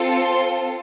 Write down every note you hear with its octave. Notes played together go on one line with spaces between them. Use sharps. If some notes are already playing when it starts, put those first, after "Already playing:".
Already playing: C4 F4 A4
C6